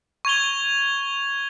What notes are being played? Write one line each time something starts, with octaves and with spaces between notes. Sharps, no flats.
C#6 G#6 F7 G7